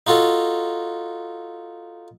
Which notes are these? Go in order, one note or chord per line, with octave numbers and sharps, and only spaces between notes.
D#4 F4 F#4 A4